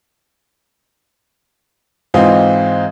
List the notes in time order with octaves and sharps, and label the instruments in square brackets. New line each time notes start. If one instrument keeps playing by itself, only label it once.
[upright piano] G#2 E3 C4 D#4 F4